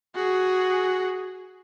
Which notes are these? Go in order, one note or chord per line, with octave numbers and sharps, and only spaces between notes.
F#4 G#4